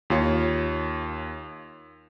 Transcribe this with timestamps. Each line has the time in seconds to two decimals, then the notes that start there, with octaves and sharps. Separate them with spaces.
0.10 D#2 F4 C#5